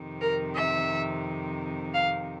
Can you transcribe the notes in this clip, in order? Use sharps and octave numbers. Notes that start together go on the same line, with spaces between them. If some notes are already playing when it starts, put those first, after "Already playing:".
Already playing: F2 C3 D#3
A#4
E5
F5